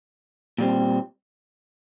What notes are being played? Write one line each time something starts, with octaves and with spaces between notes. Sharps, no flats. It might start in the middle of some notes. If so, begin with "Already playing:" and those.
A#2 G3 C4